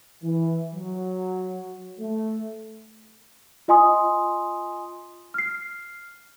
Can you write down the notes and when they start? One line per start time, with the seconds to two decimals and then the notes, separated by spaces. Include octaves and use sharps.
0.23 E3
0.75 F#3
1.99 A3
3.68 F4 D#5 G#5 C6 D#6
5.34 F6 C7